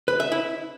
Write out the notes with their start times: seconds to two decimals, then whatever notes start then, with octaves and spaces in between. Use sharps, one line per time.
0.08 B4
0.20 E5
0.32 E4